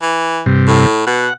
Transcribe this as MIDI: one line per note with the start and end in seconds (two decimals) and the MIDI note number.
0.02 0.42 52
0.46 0.87 43
0.46 0.87 48
0.68 1.07 45
1.07 1.28 47
1.07 1.33 78